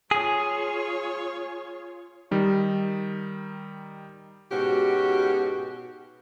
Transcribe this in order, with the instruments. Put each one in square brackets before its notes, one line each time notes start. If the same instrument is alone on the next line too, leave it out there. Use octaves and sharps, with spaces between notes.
[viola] F4 C#5 [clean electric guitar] G#4
[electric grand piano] D#3 G3 D#4
[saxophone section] G#2 B2 C#4 F#4 G4